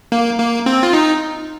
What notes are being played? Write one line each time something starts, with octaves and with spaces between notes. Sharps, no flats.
A#3
A#3
C4
F4
D#4